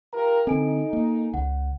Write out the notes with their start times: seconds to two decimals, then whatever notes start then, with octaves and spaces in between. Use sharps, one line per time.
0.13 F4 G4 A#4 A#5
0.47 D3 C4 D#4 A4 G#5 D7
0.93 A#3
1.34 C#2 F#5